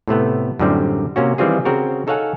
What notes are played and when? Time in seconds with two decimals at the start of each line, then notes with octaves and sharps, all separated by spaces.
0.08 A2 C3 A3 B3
0.59 F#2 A2 D3 G3 C4
1.16 C3 A#3 C#4 F#4
1.38 D#3 E3 G3 C4 F4 G#4
1.65 C#3 C4 F#4 A#4
2.07 D#4 A4 C#5 F5 F#5 G#5